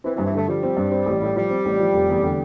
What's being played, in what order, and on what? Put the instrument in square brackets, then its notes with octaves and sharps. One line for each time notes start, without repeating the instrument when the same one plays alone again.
[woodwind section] E3 [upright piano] C4
[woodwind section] E3
[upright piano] G2
[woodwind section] E3
[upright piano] D3 [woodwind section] A3
[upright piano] F3 [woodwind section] G3
[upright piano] C4
G2
C4
A1
A2
[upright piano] F3 [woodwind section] G3
[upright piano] C4
A1
F3
F1
E2
D3